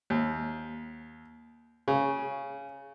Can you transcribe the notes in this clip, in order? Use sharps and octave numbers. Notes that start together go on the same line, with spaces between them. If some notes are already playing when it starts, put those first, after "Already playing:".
D#2
C#3